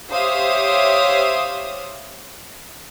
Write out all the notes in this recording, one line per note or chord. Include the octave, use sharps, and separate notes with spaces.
G4 C5 C#5 E5 F5 D#6